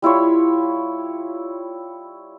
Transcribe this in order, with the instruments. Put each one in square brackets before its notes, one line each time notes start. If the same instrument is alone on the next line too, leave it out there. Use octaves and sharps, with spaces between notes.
[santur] G3 E4 F4 C#5